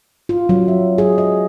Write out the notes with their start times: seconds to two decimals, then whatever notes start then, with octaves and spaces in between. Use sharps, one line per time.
0.29 F4
0.49 F#3
0.68 E5
0.98 G#4
1.18 D#5